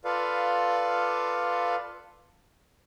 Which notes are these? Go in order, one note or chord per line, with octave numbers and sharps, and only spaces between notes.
F4 A4 B4 D5 F5